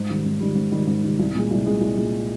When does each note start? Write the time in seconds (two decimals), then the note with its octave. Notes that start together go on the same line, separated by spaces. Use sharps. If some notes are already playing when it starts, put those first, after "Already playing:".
Already playing: G#2
0.09 D#3 G3
0.25 G#2
0.40 D#3 G3
0.55 G#2
0.71 D#3 G3
0.87 G#2
1.03 D#3 G3
1.19 C2
1.35 A#2 G#3
1.51 C2
1.66 A#2 G#3
1.81 C2
1.97 A#2 G#3